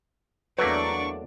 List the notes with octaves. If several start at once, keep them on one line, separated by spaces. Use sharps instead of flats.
E2 F#3 A3 A#3 D4 B4 D5 C#6